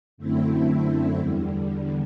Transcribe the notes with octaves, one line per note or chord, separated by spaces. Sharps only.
F#2 D3 A3 C4 E4
E2 D3 G3